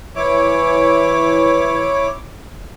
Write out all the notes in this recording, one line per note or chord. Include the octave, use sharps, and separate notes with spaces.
E3 E4 C#5 D6